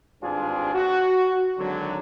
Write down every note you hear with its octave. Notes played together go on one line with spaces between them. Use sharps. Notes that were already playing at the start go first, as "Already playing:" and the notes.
G#1 G2 C4 D4 F4 G#4
F#4
G#1 D3 F#3